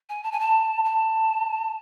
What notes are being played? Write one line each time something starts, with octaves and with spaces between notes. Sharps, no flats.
G#5
A5
G#5
A5
A5